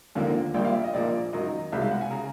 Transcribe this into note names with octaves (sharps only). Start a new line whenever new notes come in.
D#2 D3 F3 A#3
A#1 A#2 G3 A#3 G5
F5
E5
D#5
A#1 A#2 F3 A#3 D5
F#2 D#3 F#3 D#5
C2 B2 G#3 E5
F5
F#5
G#5
C#3 A#5